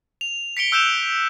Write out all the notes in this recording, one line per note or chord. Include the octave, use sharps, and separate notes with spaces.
F7
B6 C#7 D7 G7
E6 F#6 G6 D7 E7 F7